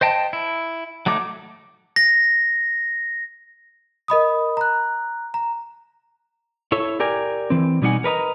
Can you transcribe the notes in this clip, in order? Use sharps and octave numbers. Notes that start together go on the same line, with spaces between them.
C5 D#5 G5 A5
E4
F#3 A3 D#4 D6
A#6
A#4 D#5 B5 D#6
A#5 F#6
A#5
E4 A4 C#5 E5
G4 A#4 D5 G#5
E3 C4
B2 G3 D#4 F4 F#5 G#5
A#4 B4 D#5 A#5